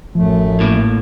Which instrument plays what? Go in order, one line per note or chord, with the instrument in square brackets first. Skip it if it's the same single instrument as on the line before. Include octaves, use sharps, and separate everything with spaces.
[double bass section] A1 [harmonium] F#2 A3 [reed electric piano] F3
[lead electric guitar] A2 A#3